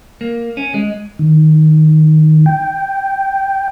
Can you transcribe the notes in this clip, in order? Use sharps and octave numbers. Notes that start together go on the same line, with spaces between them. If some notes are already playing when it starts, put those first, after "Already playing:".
A#3
C#4
G#3
D#3
G5